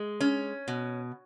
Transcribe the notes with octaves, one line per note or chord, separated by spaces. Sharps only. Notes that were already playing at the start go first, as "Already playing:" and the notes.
Already playing: G#3
C#4
B2